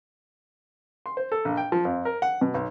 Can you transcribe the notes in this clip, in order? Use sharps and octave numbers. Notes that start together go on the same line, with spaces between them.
C6
C5
A4
A#1
G5
F3
F2
A#4
F#5
B2
B1